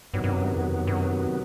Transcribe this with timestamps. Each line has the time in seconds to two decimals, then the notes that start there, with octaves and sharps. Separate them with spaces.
0.14 G2 C3 D#3 F#3 B3
0.24 G2
0.33 F#2
0.44 G2
0.54 F2
0.87 G2
0.92 F#2